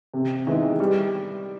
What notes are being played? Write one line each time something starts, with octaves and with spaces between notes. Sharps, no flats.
C3
D#3 G#3 B3 E4
G3